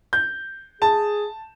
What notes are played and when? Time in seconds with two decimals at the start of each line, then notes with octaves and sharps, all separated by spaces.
0.13 G6
0.82 G#4 A5